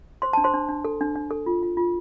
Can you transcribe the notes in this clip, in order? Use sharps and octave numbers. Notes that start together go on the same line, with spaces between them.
C5 C6
D4 A5
C5 C6
D4
D4
A4
D4
D4
A4
F4
F4
F4